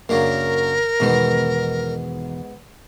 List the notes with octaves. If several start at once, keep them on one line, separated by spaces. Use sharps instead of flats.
F#2 C#3 F#3 A#3 D4 A#4
E2 G#2 B2 D#3 B3